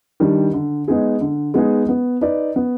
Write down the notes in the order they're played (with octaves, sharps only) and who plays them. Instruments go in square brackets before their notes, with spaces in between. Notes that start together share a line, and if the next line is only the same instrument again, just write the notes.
[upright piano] D#3 G3 D4
D3
G#3 B3 D#4 G#4
D3
G#3 B3 D#4 G#4
B3
D#4 B4 D5
B3